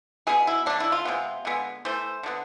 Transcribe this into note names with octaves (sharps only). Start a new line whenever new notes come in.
B2 B3 G#4
E4
D3 A3 D4
E4
F4
C3 G#3 B3
D3 G#3 B3
E3 A3 C5
D3 G#3 B3